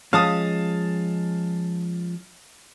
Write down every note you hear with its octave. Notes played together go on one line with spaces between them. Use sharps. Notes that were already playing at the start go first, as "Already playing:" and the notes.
F3 G#3 C#4 F5 A5 D#6